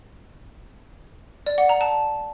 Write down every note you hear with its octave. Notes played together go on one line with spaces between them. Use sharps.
D5
F#5
A#5
A5